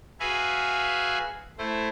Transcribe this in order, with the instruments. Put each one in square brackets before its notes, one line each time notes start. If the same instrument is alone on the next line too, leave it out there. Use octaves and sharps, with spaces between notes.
[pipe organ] F#4 G#4 B4 E5 F5 G#5
A3 E4 C5